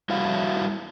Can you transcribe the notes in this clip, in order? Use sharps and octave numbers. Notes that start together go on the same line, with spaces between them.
G3 E4 F#4 F5